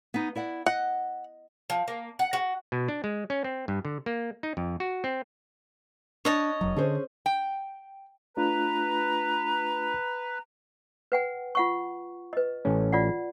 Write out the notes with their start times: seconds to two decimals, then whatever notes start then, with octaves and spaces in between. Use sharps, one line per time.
0.14 B3 D#4
0.36 E4 D5 F#5
0.66 D#5 F#5
1.70 F3
1.88 A#3
2.19 F#5
2.33 F#4
2.72 B2
2.88 D4
3.04 G#3
3.30 C#4
3.44 C4
3.68 G2
3.85 D3
4.06 A#3
4.43 D#4
4.57 F2
4.80 F#4
5.04 C4
6.25 D4 C#5 D#5 A5
6.61 F1 F#2 F#3
6.76 D3 C#4 G#4 C5
7.26 G5
8.37 A3 D4 F4 B4 A#5
11.12 B4 F#5 G5
11.55 F4 F#5 C#6
12.33 B4 D#5
12.65 A1 A2 C#4
12.92 F4 D5 F#5